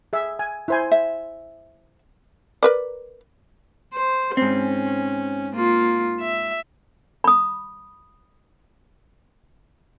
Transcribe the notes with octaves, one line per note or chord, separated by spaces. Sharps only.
G#4 E5
G#5
E4 C5 G#5
E5
A#4 B4 D5
C5
G#2 C4 C#4
A#3 F4
E5
B5 D#6